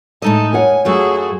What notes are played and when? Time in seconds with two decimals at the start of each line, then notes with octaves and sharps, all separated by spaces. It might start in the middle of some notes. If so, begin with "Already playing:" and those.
0.22 A2 G#3 D#4 A4 D#5
0.53 A#4 C#5 F#5 G#5
0.85 F#2 A3 F4 F#4 G#4